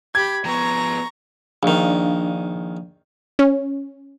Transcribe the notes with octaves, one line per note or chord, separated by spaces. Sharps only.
G4 B5 G#6
F3 B3 A#5 C#6
A#1 D#3 D4 F5
C#4